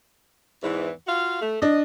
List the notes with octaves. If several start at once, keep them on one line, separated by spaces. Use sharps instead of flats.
E2 G#2 E3
F4 F#4 F5
A3
D4 D#5